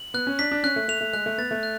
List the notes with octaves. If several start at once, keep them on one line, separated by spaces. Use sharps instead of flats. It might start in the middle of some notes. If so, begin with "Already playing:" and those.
Already playing: F#7
B3 F#6
C#4
D4 B6
D4
C#4 F#6
A3
A3 F7
A3
G#3 F#6
A3
B3 A6
A3
F#6